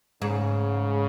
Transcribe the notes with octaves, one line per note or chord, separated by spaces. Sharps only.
G#2 C#3